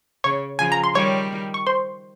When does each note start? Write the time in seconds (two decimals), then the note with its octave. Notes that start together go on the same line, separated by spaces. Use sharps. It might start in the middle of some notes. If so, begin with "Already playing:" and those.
0.24 C#3 C#5 C#6
0.59 C#3 F3 G#5
0.72 A#5
0.84 C6
0.95 D#3 G3 C#5 C#6
1.54 C#6
1.67 C5 C6